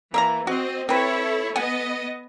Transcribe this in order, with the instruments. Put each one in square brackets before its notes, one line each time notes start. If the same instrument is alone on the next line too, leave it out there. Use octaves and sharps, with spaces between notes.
[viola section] E3 [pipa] A#3 E5 A#5
[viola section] C4 D#5 [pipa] F#4
[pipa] C4 B4 [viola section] E4 A4 C#5
[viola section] B3 D#5 [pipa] F#5 G#5